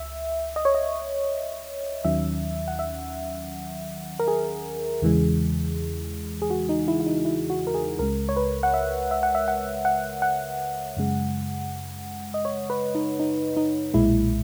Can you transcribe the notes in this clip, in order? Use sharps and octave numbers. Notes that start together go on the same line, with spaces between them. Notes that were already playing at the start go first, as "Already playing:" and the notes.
Already playing: C#2 E5
D#5
C#5
D#5
D#2 D#3 F#3 C#4 E5
F#5
E5
A#4
G#4
E2 C#3 E3 G#3
G#4
F#4
D#4
E4
E4
D#4
E4
F#4
A#4
G#4
C#2 C#3 G#3 A#4
C#5
B4
F#5
E5
E5
F#5
E5
F#5
F#5
F#5
F#2 C#3 G#3
D#5
C#5
B4
D#4
D#4
D#4
B1 A#2 G#3 E4